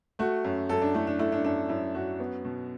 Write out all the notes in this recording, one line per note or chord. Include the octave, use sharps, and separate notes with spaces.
A3 F#4
F#2
F#2 A4
D4
A3 E4
D4
A3 E4
D4
F#2 D4
F#2 E4
F#2 F#4
B3
B2